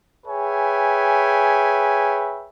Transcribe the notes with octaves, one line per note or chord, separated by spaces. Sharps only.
G#4 B4 C#5 E5 G5 G#5